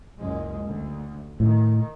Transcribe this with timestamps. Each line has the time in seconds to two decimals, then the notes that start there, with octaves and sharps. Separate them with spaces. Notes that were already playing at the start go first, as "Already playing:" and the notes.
0.20 F#1 C#2 G#3
0.67 D2
1.40 A2 D#3